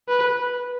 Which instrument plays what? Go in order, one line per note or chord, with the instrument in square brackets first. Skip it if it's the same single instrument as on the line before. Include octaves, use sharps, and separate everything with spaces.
[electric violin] B4